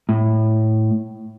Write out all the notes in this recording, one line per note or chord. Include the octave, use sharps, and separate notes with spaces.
A2